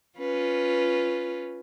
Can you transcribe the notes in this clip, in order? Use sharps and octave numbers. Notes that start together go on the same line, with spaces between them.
C#4 F4 B4